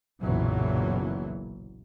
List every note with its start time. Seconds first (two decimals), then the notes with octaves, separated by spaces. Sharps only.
0.22 F#1 B1 A#2 E3 F#3